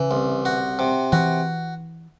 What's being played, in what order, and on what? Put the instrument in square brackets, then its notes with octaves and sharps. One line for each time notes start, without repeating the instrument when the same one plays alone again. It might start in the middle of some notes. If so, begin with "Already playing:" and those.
Already playing: [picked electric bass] C#3 [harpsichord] E3
[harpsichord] C2
F#4
C3
[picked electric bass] E3 [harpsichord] F#4